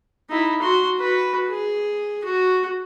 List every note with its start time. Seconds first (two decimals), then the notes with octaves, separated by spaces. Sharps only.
0.30 D#4 E4
0.62 F#4 C6
0.99 F#4 B4
1.49 G#4
2.25 F#4